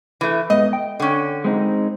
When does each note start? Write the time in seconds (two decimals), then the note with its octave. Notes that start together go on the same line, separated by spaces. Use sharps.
0.21 E3 A3
0.50 G#2 B3 D#5
0.73 G5
1.00 D3 C#4
1.45 G#3 C4 D#4